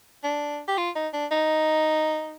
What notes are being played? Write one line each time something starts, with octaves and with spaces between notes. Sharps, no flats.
D4
G4
F4
D#4
D4
D#4